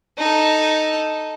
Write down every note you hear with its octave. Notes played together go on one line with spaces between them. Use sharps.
D#4 A4